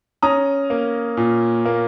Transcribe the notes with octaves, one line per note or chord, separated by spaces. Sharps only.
C#4 A#5 D#6
A#3
A#2
A#3